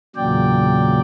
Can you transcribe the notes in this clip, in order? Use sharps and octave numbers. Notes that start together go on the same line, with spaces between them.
E2 A#2 C#3 F#3 D5 G5